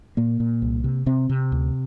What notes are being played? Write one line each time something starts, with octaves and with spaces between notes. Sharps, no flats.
A#2 A#3
A#2
C2
C3
C3 C4
C3
D2